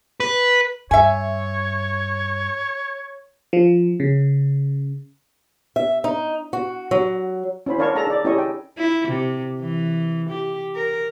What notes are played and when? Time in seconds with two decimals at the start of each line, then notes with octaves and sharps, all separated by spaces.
0.20 B4
0.91 G2 C#5 E5 G#5
3.53 F3
4.00 C#3
5.76 E5
6.04 D#4
6.53 F#4
6.91 F#3
7.66 C#4 E4 C5 B5
7.78 D4 A#4 C#5 F5 A5 C#6
7.95 G#4 A4 A5 A#5
8.07 D#4 D5
8.25 C#4 E4 G4 A4 D#5 C#6
8.38 G5
8.78 E4
9.09 C3
9.60 E3
10.30 G4
10.75 A#4